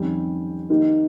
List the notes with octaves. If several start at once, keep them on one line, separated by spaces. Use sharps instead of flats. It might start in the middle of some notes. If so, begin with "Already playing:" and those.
Already playing: F2 D#3 G3 C#4 G4
D#3 A#3 D#4 G4